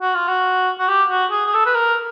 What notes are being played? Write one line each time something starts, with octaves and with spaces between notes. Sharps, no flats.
F#4
F4
F#4
F#4
G4
F#4
G#4
G#4
A4
B4
A#4